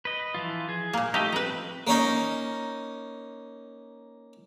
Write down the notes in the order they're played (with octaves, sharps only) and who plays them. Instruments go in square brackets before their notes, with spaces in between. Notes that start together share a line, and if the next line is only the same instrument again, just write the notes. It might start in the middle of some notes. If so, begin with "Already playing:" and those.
[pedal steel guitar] B4 D#5
E3 F3 F4
G#4
[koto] A#2 A#3
[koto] A3 [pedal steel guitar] D#4 G4 D#5
[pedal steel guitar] F3 C4 G4 [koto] B4 A#5
[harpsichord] A#3 C#4 D#4